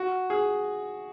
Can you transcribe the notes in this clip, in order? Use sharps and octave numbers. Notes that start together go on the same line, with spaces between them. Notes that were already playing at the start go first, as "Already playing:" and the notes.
Already playing: F#4
G#4